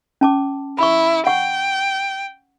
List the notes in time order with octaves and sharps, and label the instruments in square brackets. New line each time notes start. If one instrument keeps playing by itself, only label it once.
[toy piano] C#4 A5 D6
[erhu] E4 [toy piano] B5 C#6
[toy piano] F#5 C#6 [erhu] G5